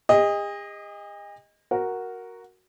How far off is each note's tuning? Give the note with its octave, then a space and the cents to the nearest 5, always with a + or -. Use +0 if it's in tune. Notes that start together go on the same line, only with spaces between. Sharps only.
G#4 -45 D#5 +0
F#4 +0 A#4 +0